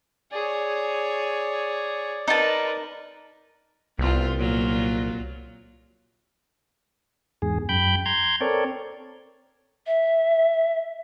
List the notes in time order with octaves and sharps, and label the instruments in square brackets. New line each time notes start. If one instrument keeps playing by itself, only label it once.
[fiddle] G#4 C#5 [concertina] D5
[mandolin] D#4 A5 [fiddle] A#4 B4
[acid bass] C2 [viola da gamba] B3 C4 F4
[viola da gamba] A#2 F#3 F4
[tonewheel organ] E2 G#2 G#4
F#2 G5 B5 G6
A#5 C6 G6 G#6
C4 A4 A#4 C#5 D5
[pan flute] E5